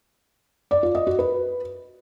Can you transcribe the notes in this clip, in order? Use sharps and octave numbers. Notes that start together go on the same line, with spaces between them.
D5
F4
D#5
F#4
B4